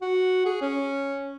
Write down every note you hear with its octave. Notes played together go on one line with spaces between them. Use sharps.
F#4
G#4
C#4